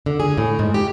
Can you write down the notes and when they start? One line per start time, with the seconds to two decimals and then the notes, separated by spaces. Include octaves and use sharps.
0.06 D3
0.20 G#4
0.38 A2
0.59 G#2
0.74 G4